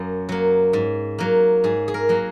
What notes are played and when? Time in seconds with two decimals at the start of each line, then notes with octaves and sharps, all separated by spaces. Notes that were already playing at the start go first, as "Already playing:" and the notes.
Already playing: F#2 F#3 A#3
0.29 F#3 A#3
0.73 G#2
1.18 F#3 A#3
1.64 G#2 G#4
1.88 G#4
1.94 A#4
2.09 F#3 A#3